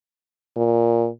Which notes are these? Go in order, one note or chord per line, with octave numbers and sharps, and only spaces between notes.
A#2